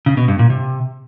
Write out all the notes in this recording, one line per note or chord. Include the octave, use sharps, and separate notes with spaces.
C#3
B2
G2
A#2
C3